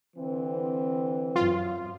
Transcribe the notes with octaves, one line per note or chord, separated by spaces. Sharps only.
D3 E3 C4
F#2 F4